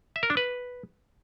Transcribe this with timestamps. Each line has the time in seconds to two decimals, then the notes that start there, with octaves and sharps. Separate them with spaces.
0.16 E5
0.23 A#4
0.30 D4
0.37 B4